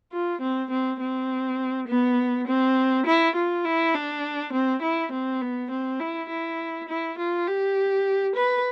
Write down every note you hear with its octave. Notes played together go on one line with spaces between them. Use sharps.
F4
C4
C4
C4
B3
C4
E4
F4
E4
D4
C4
E4
C4
B3
C4
E4
E4
E4
F4
G4
B4